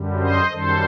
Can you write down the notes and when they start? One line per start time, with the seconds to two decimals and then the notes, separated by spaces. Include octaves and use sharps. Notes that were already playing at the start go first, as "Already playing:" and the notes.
Already playing: F#2 D3 G3
0.19 C5 D#5
0.51 F#2 D#3 G3 A4 C5